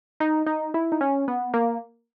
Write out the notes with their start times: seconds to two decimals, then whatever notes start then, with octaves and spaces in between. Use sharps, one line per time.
0.20 D#4
0.46 D#4
0.74 E4
0.92 D#4
1.01 C#4
1.28 B3
1.54 A#3